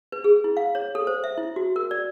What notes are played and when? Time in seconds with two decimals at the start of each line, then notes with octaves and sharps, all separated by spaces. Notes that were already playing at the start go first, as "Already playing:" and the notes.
0.12 B4
0.24 G#4
0.44 E4
0.57 F5
0.75 C#5
0.95 A4
1.07 C5
1.24 E5
1.38 E4
1.56 F#4
1.76 A#4
1.91 D5